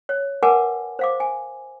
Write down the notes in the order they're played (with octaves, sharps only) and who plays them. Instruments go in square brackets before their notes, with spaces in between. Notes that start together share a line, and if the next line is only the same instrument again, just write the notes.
[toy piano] C#5
A#4 B4 F#5 G#5 A5 D6
C5 F5 D6
G#5